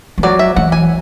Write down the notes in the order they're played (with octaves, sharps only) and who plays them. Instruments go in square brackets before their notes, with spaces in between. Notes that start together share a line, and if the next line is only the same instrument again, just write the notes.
[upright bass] E3
[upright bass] F#3 [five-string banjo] D5
[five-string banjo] E5
[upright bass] E3 [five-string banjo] F#5
[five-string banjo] G#5